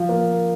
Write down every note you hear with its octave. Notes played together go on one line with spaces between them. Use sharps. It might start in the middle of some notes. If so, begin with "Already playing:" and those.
Already playing: F3
A#3